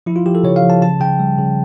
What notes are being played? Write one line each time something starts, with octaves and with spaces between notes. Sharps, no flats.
F3 E4
F4
F3 G4
A4
C#3 C#5
F5
F3
A5
C#3 A5
C#3 G5
G3
C#3